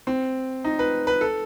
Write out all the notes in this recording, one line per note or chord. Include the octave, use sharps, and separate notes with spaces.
C4
D#4
B4
B4
A4